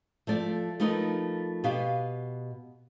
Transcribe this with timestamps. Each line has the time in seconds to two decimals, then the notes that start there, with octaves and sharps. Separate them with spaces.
0.27 F3 A3 D5
0.80 F3 A3 D#4 A#4 B4
1.64 B2 B3 G4 F5